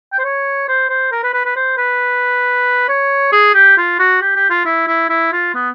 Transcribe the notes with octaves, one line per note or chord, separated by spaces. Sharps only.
G5
C5
C#5
C5
C5
A#4
B4
B4
B4
C5
B4
C#5
G#4
G4
F4
F#4
G4
G4
F4
E4
E4
E4
F4
B3